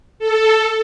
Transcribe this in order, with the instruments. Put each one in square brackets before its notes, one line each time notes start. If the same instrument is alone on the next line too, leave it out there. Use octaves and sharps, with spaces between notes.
[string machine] A4